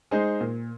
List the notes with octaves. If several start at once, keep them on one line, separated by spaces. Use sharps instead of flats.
G#3 D#4 G#4 C5
A#2